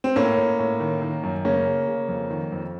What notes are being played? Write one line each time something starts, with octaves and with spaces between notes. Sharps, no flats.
C4
A2 A#3 C#4
A2
A2
D#3
D#3
F#2
C#3 A#3 C#4
C#3
C#3
F2
D#3
F2